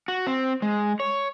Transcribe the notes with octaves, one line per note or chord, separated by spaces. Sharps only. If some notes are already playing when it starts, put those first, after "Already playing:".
F#4
C4
G#3
C#5